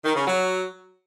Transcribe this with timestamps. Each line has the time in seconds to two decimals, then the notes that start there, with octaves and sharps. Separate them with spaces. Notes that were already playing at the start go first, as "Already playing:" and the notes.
0.04 D#3
0.15 C#3
0.26 F#3